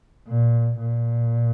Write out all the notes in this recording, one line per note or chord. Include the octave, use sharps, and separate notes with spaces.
A#2
A#2